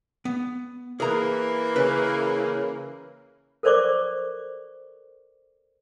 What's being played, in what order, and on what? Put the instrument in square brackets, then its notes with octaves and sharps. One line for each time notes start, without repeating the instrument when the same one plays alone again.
[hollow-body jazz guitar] B3
[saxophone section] E3 A#3 [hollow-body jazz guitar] G#4 A#5
[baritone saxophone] C#3 [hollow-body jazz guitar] B4
[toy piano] A4 A#4 C5 D5 C#6 D6